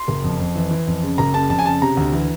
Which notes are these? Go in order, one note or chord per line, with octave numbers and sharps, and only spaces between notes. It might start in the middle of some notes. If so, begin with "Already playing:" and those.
Already playing: C6
F#1
F2
F2
E3
E3
F2
C#3
F#1 A#5
C#3 A5
F2 A5
G#5
C#3 A5
C3 A#5
D2
E3